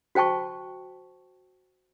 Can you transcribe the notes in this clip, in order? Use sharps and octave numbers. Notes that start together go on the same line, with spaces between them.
F#4 C5 G5 A5 C#6